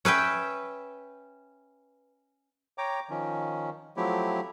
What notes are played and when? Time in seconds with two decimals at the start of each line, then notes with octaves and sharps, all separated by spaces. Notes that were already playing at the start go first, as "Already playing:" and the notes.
0.05 C#4 B4 E5 G5
2.78 C#5 G5 A#5 D6
3.10 D#3 F3 C#4
3.97 F3 F#3 A3 C4 E4 G4